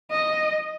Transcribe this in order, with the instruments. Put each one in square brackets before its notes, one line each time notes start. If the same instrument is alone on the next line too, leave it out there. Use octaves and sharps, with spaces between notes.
[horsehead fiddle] D#5